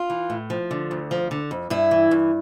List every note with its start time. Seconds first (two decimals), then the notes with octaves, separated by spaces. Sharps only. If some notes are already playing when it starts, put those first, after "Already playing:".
Already playing: F4
0.10 E3
0.30 A2
0.50 F3
0.71 D3
0.91 D2
1.11 F3
1.31 D3
1.51 F2
1.70 G2 E4
1.91 E3
2.11 G2